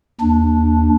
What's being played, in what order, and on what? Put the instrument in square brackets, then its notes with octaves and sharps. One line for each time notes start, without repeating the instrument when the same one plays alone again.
[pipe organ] D#2 D4